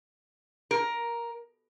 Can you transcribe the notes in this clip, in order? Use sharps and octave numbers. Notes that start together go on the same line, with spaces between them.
A#4